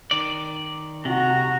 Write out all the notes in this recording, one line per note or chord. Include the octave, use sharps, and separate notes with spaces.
D#3 D5
C3 F#4 A#5